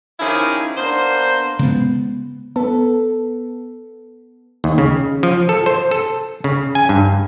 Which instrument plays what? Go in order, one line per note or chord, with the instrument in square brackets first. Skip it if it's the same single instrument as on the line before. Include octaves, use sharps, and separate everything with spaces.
[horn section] D#3 F3 C#4 E4 G4 G#4
A#3 B3 D4 C5
[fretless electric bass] C#3 G#3 B3
[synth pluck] B3 A4
[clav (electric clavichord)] D#2
C#3
F3
A4
C5
A4
C#3
G#5
G2